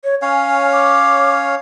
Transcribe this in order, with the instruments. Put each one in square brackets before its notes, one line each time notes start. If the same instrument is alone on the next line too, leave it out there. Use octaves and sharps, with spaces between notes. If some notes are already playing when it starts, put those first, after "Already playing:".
[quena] C#5
[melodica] C#4 C#5 F5 [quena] G#5
[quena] D6